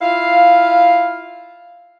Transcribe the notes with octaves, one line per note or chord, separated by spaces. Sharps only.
E4 F4 F5